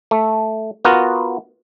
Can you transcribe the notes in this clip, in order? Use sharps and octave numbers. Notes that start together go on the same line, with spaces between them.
A3
B3 F4 F#4 A#4